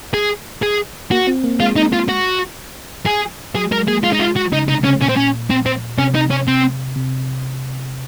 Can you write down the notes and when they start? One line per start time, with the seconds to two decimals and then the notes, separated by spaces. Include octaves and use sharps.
0.14 G#4
0.62 G#4
1.11 A#3 F#4
1.27 C4
1.44 A#3
1.60 G#3 F4
1.76 D#4
1.93 F4
2.09 F#4
3.06 G#4
3.55 F#3 G#4
3.71 G#3 A#4
3.87 A#3 G#4
4.03 G#3 F4
4.13 D#4
4.19 F4
4.36 F#4
4.52 C#3 D#4
4.68 C3 D#4
4.84 C#3 C#4
5.01 A#2 C#4
5.09 C4
5.16 C#4
5.50 C4
5.66 C4
5.98 C3 C#4
6.15 D#4
6.30 C#4
6.48 C4
6.96 C3